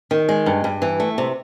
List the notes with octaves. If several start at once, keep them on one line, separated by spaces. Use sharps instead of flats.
D#3
G#3
G2
G2
E3
A3
C3